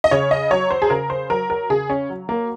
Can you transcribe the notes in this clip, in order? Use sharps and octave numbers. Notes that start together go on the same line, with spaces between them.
D#5
C#3 C#5
D#5
F#3 C#5
C5
G#4
C#3 A#4
C5
F#3 A#4
A#4
C#3 G#4
C#4
F#3
A#3